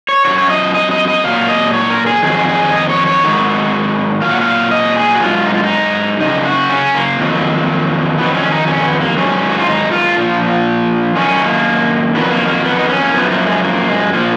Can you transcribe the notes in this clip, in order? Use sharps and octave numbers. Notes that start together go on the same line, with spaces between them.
C#5
F#2 D#3 F#3 C#5
C#5
D#5
D#5
D#5
D#5
A#2 F#3 F5
D#5
C#5
A#4
G#4
F2 D#3 F#3 G#4
G#4
D#5
C#5
C#5
G#2 D#3 F#3
A#2 F#3 F5
F#5
F5
D#5
G#4
F#4
G#2 F#3 F4
D#4
F4
D#4
F#2 C#3 D#4
F#4
C#4
A#3
F2 D#3 F#3
F2 D#3 F#3 B3
C#4
D#4
C#4
A#3
B3
A#3
G#2 D#3 F#3 C#4
F#4
F4
D#4
F4
A#2 F3
F#2 D#3 F#3 C#4
A#3
F2 D#3 F#3 B3
A#3
A#3
B3
D#4
C#4
A#3
F#2 F3 B3
A#3
G#3
A#3
G#3
A#2 F3 A#3